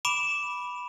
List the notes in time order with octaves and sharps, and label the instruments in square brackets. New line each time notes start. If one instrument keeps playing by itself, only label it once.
[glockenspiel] B5 D6 D7 E7